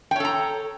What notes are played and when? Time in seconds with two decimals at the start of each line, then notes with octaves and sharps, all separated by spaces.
0.11 G5
0.16 C#5
0.20 A4
0.25 A#5